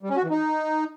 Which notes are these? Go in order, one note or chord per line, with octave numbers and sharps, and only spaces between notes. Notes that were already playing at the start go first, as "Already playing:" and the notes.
G3
C#4
F#4
E3
D#4